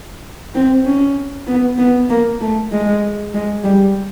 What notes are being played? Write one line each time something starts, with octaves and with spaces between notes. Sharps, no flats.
C4
C#4
B3
B3
A#3
A3
G#3
G#3
G3